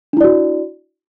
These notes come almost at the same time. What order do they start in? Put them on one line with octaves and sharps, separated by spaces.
D4 E4 D5 F#4